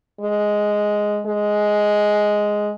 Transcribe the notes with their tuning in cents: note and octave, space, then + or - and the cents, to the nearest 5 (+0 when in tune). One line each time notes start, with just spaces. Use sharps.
G#3 +0
G#3 +5